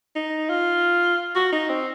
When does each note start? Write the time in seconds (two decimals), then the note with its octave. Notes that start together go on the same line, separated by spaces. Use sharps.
0.16 D#4
0.50 F4
1.35 F#4
1.52 D#4
1.69 C4